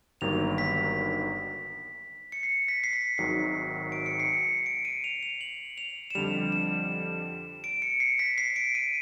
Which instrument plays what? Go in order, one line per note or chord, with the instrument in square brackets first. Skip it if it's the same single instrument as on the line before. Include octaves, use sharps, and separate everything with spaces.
[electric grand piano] G1 G2 D#3 F#3 A#3 [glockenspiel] F7
[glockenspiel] B6
C#7
C7
B6
C7
B6
[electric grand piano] G#1 G#2 D#3 F#3 [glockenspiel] C7
[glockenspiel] D7
C#7
C7
C#7
D7
D#7
F7
F7
F#7
F7
E7
[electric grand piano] F2 D3 G3 [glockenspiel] F7
[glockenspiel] E7
D7
C#7
C7
B6
C7
D7
D#7